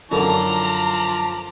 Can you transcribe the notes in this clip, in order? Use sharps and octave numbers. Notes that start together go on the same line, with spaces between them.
F#2 D3 F3 E4 A5 A#5 D6